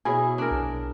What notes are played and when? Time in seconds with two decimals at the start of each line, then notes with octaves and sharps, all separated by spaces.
0.05 B2 E4 G#4 C#5 G#5
0.38 D4 A#4
0.51 B1